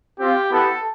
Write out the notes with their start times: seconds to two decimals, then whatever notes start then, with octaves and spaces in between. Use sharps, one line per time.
0.19 C4 F4 G4
0.51 B3 E4 G4 A4